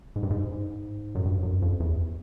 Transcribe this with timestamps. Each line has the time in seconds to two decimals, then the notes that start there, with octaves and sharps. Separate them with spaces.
0.16 G#2
0.23 G2
0.30 G#2
1.15 F#2
1.25 G2
1.43 F#2
1.62 F2
1.80 E2